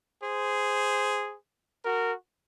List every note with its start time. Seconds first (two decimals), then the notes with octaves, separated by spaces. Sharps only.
0.23 G#4 C5
1.84 F#4 A#4